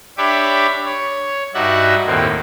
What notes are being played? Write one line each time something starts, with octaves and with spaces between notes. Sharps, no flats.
D4 G4 C#5 E5 B5 D6
C#5
G2 D#4 F#4 D5 E5 F#5
D#2 A2 A#3 C4